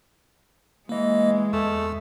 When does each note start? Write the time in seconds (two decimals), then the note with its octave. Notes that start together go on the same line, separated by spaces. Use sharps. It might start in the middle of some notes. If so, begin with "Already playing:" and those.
0.89 E3 G#3 A#3 D#5
1.53 E2 A3